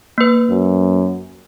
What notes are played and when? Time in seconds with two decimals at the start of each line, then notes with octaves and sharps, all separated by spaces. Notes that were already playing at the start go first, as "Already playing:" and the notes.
0.18 A#3 B4
0.50 F#2